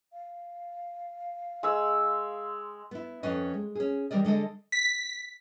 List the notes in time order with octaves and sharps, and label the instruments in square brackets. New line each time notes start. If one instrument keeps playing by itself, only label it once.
[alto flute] F5
[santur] G#3 E6
[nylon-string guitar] B3 E4
F2 C#4 B4 D#5
G#3
C#4 G#4
E3 G3 A#4 D5 D#5
D3 G#3 A4 D#5
[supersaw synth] B6